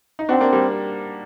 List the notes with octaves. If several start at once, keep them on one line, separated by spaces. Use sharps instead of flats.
D#4
C4 D4 F#4
A#3 D4
G3 A#3